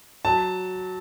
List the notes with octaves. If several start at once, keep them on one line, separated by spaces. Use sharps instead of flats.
F#3 A5